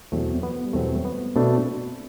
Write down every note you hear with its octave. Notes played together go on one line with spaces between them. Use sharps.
E2 B2 F#3 A3 C4
B3
G3
E2 B2 F#3 A3 C4
B3
B2 A3 C4 D4